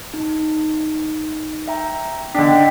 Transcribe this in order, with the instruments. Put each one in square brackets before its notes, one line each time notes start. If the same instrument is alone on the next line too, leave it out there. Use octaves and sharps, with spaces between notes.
[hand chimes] D#4
E5 G5 A#5
[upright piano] D3 D4 [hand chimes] D#5 B6 [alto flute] G5